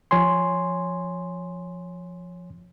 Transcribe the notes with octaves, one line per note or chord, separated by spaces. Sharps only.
F3 C#5 G#5 C6